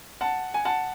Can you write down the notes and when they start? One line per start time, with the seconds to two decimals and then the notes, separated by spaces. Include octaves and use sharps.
0.21 F#5 A5
0.54 G#5
0.65 F#5 A5